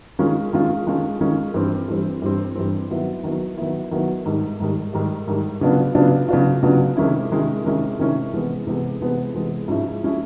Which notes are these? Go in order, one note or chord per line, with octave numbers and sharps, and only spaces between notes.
D#3 G#3 C#4 F4
D#3 G#3 C#4 F4
D#3 G#3 C#4 F4
D#3 G#3 C#4 F4
G2 E3 G3 C4
G2 E3 G3 C4
G2 E3 G3 C4
G2 E3 G3 C4
D#3 F#3 B3 E4
D#3 F#3 B3 E4
D#3 F#3 B3 E4
D#3 F#3 B3 E4
G#2 D#3 G3
G#2 D#3 G3
G#2 D#3 G3
G#2 D#3 G3
C#3 F#3 B3 D4 F4
C#3 F#3 B3 D4 F4
C#3 F#3 B3 D4 F4
C#3 F#3 B3 D4 F4
C3 D#3 G#3 C#4 E4
C3 D#3 G#3 C#4 E4
C3 D#3 G#3 C#4 E4
C3 D#3 G#3 C#4 E4
C3 E3 G#3 B3
C3 E3 G#3 B3
C3 E3 G#3 B3
C3 E3 G#3 B3
G#2 F3 G#3 C#4 E4
F3 G#3 C#4 E4